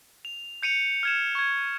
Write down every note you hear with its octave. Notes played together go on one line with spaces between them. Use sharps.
F7
G6 C#7 D#7 F7
F6 G#6 E7
C#6 G#6